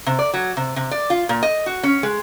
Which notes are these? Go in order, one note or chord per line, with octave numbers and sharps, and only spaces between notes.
C3
D5
F#3
C3
C3
D5
F4
A#2
D#5
F#4
C#4
G#3